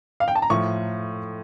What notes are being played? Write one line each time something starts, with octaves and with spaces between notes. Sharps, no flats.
F5
G5
A5
A#5
A2 F3 C#6